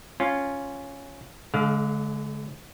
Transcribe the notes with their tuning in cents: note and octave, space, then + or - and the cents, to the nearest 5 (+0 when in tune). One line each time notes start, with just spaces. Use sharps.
C#4 +0 F4 +0
D3 -30 G#3 +30 F5 +15